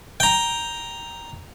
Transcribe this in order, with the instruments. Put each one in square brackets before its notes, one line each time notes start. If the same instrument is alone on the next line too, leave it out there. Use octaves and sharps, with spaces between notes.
[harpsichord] G5 A#5